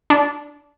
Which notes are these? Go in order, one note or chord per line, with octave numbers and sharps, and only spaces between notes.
D4